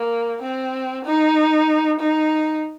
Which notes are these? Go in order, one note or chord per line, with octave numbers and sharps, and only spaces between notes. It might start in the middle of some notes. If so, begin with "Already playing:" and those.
Already playing: A#3
C4
D#4
D#4